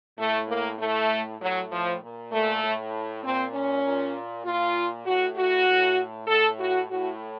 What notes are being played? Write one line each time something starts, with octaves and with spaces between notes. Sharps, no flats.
A2 A3
A#3
A2 A3
A2 F#3
F3
A#2
A3
A2
A#2 C4
C#4
A#2
A#2 F4
A2 F#4
F#4
A2
A2 A4
F#4
A2 F#4